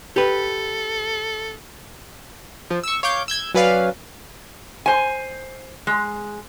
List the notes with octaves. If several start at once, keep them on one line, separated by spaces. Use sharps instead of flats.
G4 A4 B4
F3
C#6 E6
C#5 F5 D6 G6
E6 G6 G#6
F#3 C#4 B4 D5 F5
C5 G#5
G#3